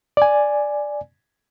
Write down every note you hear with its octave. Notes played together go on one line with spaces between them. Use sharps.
D5 G#5